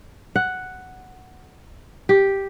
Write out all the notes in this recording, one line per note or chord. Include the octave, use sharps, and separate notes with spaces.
F#5
G4